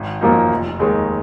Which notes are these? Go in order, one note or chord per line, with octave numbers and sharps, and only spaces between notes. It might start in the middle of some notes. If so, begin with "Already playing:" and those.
Already playing: G#1
F#2 F3 A#3 D#4
F1
D#2 D#3 G#3 D#4